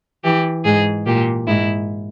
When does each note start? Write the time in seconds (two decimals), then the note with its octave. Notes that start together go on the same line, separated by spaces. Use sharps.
0.24 E3 G4
0.65 G#2 G#4
1.06 A#2 G4
1.47 G#2 E4